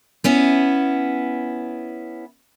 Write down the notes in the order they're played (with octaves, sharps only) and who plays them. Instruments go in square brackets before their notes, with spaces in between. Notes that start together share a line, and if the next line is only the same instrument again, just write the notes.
[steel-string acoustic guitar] B3 C#4 E4